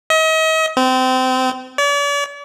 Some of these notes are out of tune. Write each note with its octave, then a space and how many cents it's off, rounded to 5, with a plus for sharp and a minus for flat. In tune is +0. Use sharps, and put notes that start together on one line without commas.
D#5 +40
C4 -25
D5 -45